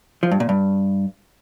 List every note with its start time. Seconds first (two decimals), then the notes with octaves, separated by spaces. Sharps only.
0.23 F3
0.31 G2
0.40 A#2
0.49 G2